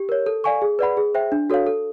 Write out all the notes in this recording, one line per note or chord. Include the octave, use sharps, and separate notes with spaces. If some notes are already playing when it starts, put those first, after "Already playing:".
Already playing: G4
A#4 C#5
A4
D5 F5 G#5 C#6
G#4
B4 D5 F#5 B5
G#4
C5 E5 G5
D4
F#4 A4 C#5 F5
A4